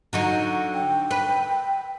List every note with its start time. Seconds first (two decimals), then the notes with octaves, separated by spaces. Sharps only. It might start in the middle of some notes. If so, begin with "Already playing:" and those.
0.13 D3 F#3 D#4
0.74 G5
1.11 B4